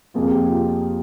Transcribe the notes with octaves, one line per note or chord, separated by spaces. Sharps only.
F2 C3 F3 A#3 F4 G#4
G4
F4